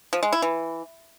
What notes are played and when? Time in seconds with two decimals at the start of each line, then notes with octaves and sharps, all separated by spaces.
0.13 F3
0.23 G#3
0.32 E4
0.42 E3